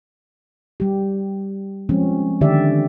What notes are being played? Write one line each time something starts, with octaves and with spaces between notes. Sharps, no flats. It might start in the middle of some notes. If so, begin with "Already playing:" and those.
G3 G4
F3 G#3 C4 C#4
D3 D#3 G4 D5 E5